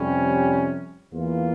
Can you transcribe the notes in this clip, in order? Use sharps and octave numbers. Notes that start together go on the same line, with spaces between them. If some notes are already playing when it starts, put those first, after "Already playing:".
Already playing: F2 C3 G3 C#4
E2 E3 A#3 F4